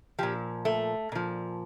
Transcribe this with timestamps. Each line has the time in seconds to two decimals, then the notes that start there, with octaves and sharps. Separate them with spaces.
0.19 A#2 F3 G4
0.65 A3
1.12 A#2 F3